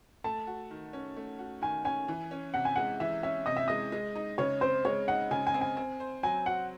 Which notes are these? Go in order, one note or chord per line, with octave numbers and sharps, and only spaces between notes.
A3 A5
F#4
D#3
C#4
A3
F#4
D#3 G#5
C#4 G#5
E3
C#4
C3 F#5
G#5
G#3 F#5
E3 E5
C#4 E5
C3 D#5
E5
G#3 D#5
G#3
D#4
C#3 C#5
C4 C5
G#3 C#5
D#4 F#5
C#3 G#5
G#5
C4
G#5
C4
C5
F#3 G#5
F#4 F#5